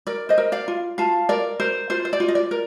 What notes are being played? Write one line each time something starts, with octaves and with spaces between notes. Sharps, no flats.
A#4 D5
C5 D#5
A#4
D5 F5
F4
F4 F5 A5
A#4 D5
A#4 C5
F4 C5
C5
D5
F4
D#5
D5
A#4